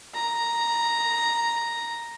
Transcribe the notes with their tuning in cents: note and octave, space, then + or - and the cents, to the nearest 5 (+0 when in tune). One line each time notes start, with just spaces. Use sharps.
A#5 +0